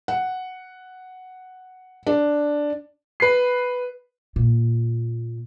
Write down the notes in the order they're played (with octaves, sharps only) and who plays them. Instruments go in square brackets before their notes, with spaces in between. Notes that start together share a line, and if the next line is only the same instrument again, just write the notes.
[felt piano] F#5
D4
[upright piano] B4 C7
[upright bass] A#2